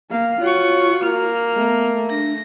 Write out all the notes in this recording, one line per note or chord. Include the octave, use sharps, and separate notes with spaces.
A#3 F5
F4 F#4 C#5 F#5 C#6
A#3 F6
A3 B3
D4 A#6